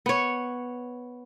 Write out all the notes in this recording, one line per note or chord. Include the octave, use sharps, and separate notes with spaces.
B3 C#5